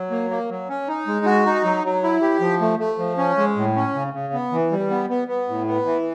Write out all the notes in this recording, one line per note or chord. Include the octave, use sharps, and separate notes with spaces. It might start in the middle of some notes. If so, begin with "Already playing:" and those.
Already playing: F#3
A#3
A#3
F#3
C#4
D#4
G#3
F#4
D#4
F#3
F#3
E4
G4
F3
A3
A3
F3
C#4
G#3
A2
C#4
C#3
C#3
B3
E3
G3
B3
B3
B3
A2
B3
E3